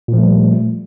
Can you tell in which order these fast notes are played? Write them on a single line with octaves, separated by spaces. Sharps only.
A#2 F3 A3 G3